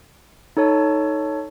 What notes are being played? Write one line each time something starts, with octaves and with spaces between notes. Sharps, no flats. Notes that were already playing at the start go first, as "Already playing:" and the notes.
D#4 A4 C#5 A5